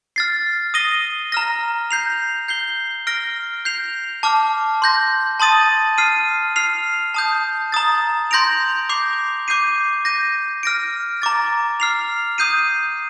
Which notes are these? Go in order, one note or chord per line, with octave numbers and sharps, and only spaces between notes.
F6 A6 C7
D#6 A#6 D#7 G7
A#5 F6 A#6
G6 C7 F7
G6 C7 G7
F6 A#6 D7 G7
G6 C7 F7
A5 D6 F6
C6 G6 A#6
A5 C6 D#6 A6 D#7
F6 C7 D#7
F6 C7 F7
A5 D#6 G6
A#5 D#6 A6
C6 G6 A#6 D7 F7
D6 G6 C7 F7
D6 G6 C7 D#7
G6 A#6 D#7
F6 A#6 D7
A#5 D6 A6
F6 C7 F7
D#6 G6 C7 D#7